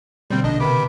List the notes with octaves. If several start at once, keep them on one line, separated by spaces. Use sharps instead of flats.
B2 D3 G3 A#3 C4 C5
A#1 D4 D#4 D#5
C3 D#3 B4 D6